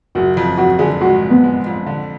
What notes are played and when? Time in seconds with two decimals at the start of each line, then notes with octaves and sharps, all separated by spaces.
0.15 F#1 F#4
0.37 F2
0.58 F2 F#4
0.79 D3 G#4
1.01 G#3 F#4
1.22 F2
1.30 B3
1.44 G#3
1.66 F2
1.86 D3